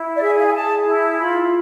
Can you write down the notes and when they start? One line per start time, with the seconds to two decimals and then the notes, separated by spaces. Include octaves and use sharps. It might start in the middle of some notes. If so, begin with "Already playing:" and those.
Already playing: E4
0.16 D5
0.21 G#4 E5
0.40 F5
0.47 G#5
0.54 G#4 A5
0.86 E4
1.19 F4 B5